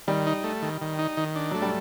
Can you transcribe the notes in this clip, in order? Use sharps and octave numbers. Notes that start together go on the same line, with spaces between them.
D#3 G3
D#4
A3
D#3
D#3
D#4
D#3
D4
F#3 A3
G3